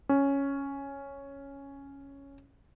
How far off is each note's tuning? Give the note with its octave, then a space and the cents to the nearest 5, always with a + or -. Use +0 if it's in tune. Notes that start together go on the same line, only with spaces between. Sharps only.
C#4 +0